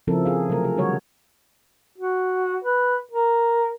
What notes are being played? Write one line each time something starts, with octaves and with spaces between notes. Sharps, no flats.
C#3 F3 C4 E4 A4 A#4
G#4 F5
C3 F#3 A3 A#4
G#4
D3 G3 F#4 C#5
F#4
B4
A#4